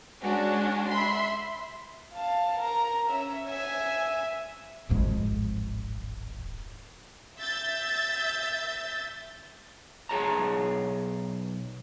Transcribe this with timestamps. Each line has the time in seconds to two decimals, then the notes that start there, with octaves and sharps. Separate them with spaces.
0.22 G#3 C#4 D4 F#4
0.90 E5 B5 C6
2.14 F5 A5
2.59 A#4 A#5
3.10 C#4 E5
3.48 E5 G#5
4.89 D1 G#1 F2 G#3
7.38 E5 E6 G6 A6
10.09 B1 G#4 C#5 A5 A#5